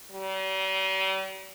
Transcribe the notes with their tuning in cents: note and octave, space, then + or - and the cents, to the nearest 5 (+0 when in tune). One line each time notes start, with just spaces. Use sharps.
G3 -45